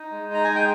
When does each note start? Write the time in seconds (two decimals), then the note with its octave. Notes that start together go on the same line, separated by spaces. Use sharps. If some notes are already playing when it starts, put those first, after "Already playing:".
Already playing: D#4
0.12 G#3
0.29 D#4 A#5
0.44 G#3 G#5
0.55 G5